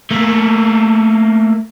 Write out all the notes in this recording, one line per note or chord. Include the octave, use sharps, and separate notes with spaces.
A3 A#3